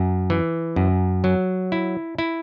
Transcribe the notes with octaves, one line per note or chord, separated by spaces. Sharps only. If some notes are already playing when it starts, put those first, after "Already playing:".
Already playing: F#2
E3
F#2
F#3
E4
E4